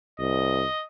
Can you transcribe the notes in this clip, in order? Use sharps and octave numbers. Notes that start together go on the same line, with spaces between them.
C2 D#5